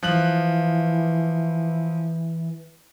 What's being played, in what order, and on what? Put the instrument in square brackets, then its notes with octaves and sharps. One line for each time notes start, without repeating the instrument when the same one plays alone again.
[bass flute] E3 [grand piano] F3 F#6 F#7